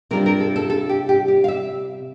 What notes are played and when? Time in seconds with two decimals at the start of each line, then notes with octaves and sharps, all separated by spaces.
0.11 C3 G3 D4 F4 A#4
0.26 A#4
0.40 A4
0.56 A4
0.70 A4
0.89 G4
1.09 G4
1.28 G4
1.44 F5
1.48 E5